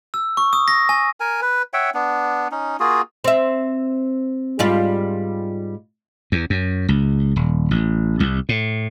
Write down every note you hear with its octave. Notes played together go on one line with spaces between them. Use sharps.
E6
C#6
D#6
A#6
G#5
A#4 G#5
B4
C#5 E5 F#5 G5
B3 D4
C#4 D#4
A#3 F4 F#4 G#4
C4 E5
G#2 G3 F4
E2
F#2
C#2
D#1
A1
C2
A2